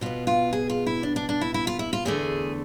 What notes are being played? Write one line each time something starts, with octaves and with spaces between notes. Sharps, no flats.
B2 B3 F4
F4
G#4
F4
E4
D4
D4
D4
E4
E4
F4
E4
F4
E2 D3 A3 G#4